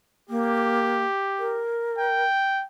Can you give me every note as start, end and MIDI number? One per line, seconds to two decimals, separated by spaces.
0.29 1.03 58
0.29 1.66 67
1.39 2.24 70
1.99 2.64 79